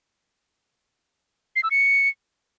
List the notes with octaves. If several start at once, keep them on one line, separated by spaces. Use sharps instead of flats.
C7
E6
C#7